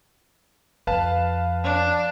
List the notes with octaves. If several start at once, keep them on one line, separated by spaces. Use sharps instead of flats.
F2 B4 F5 A5
D4